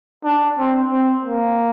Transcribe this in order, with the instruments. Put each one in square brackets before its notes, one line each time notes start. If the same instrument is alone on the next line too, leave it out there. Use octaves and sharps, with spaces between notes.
[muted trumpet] D4
C4
C4
A#3